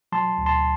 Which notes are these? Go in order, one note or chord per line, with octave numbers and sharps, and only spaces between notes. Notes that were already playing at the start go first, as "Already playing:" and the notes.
F#3 A5 C6
D2
A5 C6